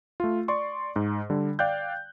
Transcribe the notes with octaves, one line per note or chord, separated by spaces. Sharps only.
A3 F4
D5 C6 C#6
G#2
D3 G3
D5 F5 G5 F#6 G6